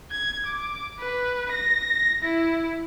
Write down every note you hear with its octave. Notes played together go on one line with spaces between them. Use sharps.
G#6
D6
B4
A#6
E4